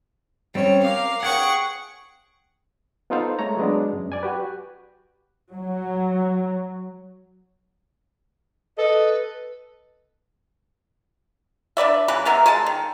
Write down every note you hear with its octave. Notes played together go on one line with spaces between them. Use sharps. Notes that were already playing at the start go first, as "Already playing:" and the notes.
G3 C4 C#4 C#5
A#4 F5 D6
G#4 F#5 G5 C#6
B3 D#4 F4 A4 C5 F5
G#3 A3 C#5 A#5
F#3 G#3 B3 D4
F#2
D5 G#5
F#4 G4 B4
F#3
A4 B4 D#5
D4 B4 D5 E5
C#3 E3 G#3 B4
G#3 B3 A#4 E5
G#3 G#5 A5
D#3